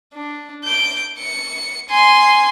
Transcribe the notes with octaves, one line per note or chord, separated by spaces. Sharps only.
D4
G6 D7
C#7
G#5 C6